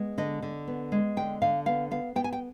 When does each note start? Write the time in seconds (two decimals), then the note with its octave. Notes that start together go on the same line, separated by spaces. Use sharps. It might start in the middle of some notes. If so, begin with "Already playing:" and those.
Already playing: G#3 B3
0.18 D3 D#5
0.42 D3
0.67 B3
0.92 G#3
1.17 D3 G5
1.42 D3 F5
1.66 B3 F5
1.91 B3 F5
2.16 B3 G5
2.24 G#5
2.33 G5